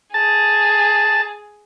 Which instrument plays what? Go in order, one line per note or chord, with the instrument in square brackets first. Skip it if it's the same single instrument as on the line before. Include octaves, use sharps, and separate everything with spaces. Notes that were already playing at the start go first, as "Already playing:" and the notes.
[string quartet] G#4 [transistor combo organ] A5